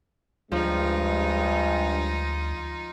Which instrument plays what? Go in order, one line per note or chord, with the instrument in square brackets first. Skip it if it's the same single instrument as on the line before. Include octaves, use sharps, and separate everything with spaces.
[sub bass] D2 [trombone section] G2 G#3 [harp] F3 [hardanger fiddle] D#4 F4